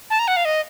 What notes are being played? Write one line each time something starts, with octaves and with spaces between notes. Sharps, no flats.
A5
A#5
F#5
F5
D#5